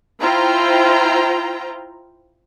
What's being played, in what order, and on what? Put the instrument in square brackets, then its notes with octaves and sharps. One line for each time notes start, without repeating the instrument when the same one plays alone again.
[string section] E4 F4 C5 G5 A#5